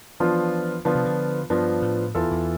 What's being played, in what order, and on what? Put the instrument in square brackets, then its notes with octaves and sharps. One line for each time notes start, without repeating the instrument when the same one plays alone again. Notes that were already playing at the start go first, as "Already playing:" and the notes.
[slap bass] E3 [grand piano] F3 B3 D4 F4
[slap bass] D3 [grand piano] F3 B3 D4 F4
[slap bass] C3
D3
[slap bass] G2 [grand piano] F3 B3 D4 F4
[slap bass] A2
[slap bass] E2 [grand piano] E3 B3 F4 A4
[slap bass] E2